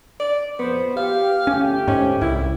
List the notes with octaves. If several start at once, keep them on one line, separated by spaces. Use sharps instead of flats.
D5
F2 A#2 B3 C5
G4 F5
G1 A3 C#4 G4
G#2 C#4
C2 E4